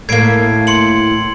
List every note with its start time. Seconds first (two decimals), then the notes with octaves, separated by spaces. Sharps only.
0.09 A2 A#3 G#6 C7 D7
0.67 C6 C#7 F#7